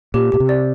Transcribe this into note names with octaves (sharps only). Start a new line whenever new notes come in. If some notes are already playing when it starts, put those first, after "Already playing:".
A#2 G4
A#2 G4
C3
D5